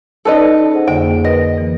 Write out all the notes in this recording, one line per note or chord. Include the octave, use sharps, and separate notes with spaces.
C#4 D#4 A4 B4 D5 D#5
G#4 C5 F#5
F2 D3 A#3 G5
A#4 B4 D#5 A#6
E3 A#3